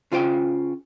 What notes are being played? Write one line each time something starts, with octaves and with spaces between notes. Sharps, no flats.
C#3 F4 C5 G5